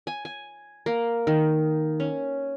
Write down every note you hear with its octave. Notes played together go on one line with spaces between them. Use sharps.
G#5
G#5
A#3
D#3
C#4